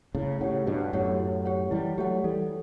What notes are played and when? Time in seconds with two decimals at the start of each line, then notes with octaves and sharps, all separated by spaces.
0.15 A2 C#3 E4
0.41 A2 C#3 G4 C#5 F#5
0.67 G2 B2 E4
0.93 F#2 A2 G4 C#5 F#5
1.20 E4
1.45 G4 C#5 F#5
1.71 E3 G3 E4
1.98 F#3 A3 G4 C#5 F#5
2.24 E3 G3 A4